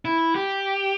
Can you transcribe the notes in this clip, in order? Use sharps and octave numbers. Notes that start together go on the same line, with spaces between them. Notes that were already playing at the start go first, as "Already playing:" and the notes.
E4
G4